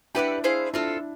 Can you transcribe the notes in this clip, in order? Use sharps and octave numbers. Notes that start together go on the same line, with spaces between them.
D4 E4 G4 B4 D5 F#5
E4 G#4 C5 F5
C4 D4 E4 F4 A4